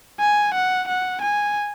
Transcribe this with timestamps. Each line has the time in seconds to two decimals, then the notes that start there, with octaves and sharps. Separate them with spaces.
0.21 G#5
0.54 F#5
0.88 F#5
1.22 G#5